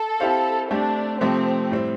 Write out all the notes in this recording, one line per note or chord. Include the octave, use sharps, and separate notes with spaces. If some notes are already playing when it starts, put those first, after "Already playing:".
Already playing: A4
C4 E4 G4 C5 F5
A3 C4 D4 G4
C3 F3 A3 C4
A2 G3 C4